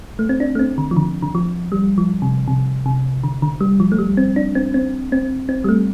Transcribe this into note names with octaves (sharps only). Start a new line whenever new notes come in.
A3
C4
D4
A3
C4
D3
F3
D3
D3
F3
G3
F3
C3
C3
C3
D3
D3
G3
F3
A3
G3
C4
D4
C4
C4
C4
C4
G3
A3